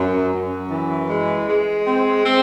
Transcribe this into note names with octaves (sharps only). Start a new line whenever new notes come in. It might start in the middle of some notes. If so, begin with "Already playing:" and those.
Already playing: F#2
F#2
E3
G#3
G#3
C4
C4